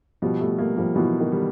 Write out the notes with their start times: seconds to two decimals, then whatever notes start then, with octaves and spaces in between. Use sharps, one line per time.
0.22 B2 F3 G3
0.40 G3 A3
0.59 G3 A3 A#3
0.77 F3 G3
0.95 B2 E3 F#3
1.20 D#3
1.32 G3